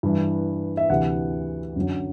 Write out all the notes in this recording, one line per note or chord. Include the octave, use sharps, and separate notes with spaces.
G2 E3
E5
D2 C3 E3 F#5
F#2 D3 F#3